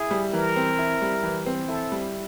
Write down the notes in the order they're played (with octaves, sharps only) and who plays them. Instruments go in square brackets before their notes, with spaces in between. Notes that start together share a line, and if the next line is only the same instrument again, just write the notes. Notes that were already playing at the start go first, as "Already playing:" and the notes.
Already playing: [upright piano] E4 [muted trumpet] G#4
[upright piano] G3
[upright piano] E3 [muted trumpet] A#4
[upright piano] C4
E4
G3
E3
C4
[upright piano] E4 [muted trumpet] A4
[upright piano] G3